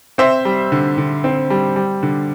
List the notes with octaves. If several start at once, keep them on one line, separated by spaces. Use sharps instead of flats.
C4 C5 E5
G3
D3
D3
C4
G3
G3
D3